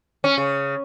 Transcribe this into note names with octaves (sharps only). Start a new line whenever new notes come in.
C#4
C#3